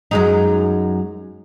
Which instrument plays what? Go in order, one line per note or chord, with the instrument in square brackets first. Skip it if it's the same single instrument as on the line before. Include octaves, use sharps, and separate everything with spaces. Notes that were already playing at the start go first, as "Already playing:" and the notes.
[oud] F#2 G#3 D#4